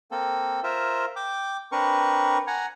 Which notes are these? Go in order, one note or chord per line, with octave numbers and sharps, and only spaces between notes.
A#3 C4 A4
F4 A#4 C5 E5
G5 D6
C4 D4 A#4 B4 C#6
F#5 G#5 A#5